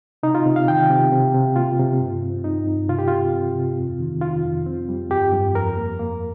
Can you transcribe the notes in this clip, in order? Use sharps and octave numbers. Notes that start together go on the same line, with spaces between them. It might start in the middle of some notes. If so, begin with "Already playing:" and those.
C3 D#4
F4
C3
F5
D#3 G5
C3
C3
C3
A#3 F4
C3
G2
C4
G2 D#4
G2
C3 F4
G4
C4 F4
C4
C3
F2
D#3
D#3 F4
F2
C4
G3
G2 G4
G2
F2 A#4
A#3
A#3